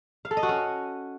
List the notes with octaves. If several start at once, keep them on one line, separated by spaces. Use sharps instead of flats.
F5
A4
D#5
F#4
C#4